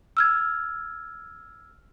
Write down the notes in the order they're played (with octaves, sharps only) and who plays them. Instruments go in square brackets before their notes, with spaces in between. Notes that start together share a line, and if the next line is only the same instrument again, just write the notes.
[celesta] E6 F6 G#6